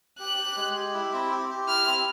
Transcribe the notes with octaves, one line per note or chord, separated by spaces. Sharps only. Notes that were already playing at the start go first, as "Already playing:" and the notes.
G4 F#6
G4
G#3
G4
E4
C4
G4
G4
E4 F6
C4